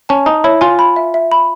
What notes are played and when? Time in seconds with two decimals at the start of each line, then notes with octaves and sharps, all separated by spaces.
0.09 C#4 A5
0.26 D#4 A5
0.44 E4 C#5
0.61 F4 G#5
0.79 B5
0.96 E5
1.14 E5
1.32 B5